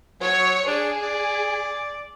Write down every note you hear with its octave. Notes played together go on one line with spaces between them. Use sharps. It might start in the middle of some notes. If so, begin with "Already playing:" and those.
F#3 C#5
D4 G#4
D5